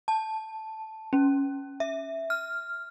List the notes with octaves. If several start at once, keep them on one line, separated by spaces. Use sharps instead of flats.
A5
C#4
E5
F6